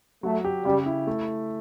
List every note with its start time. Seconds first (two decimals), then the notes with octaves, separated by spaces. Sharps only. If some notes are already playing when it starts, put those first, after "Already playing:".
0.23 F#3 A3
0.45 G4
0.65 C#3 G3
0.86 E4
1.07 A3